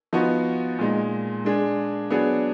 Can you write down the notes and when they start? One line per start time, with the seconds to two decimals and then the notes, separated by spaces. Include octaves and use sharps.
0.13 F3 B3 D#4 F#4
0.79 A#2 G#3 D#4
1.45 G#3 D4 G#4
2.10 F#3 B3 D4 G#4